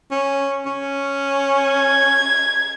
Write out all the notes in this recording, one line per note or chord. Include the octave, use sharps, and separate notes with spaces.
C#4
C#4
G#6